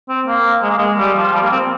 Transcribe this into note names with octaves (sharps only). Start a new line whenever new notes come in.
C4
A#3
G#3
A#3
G#3
G3
F3
G3
A#3
C4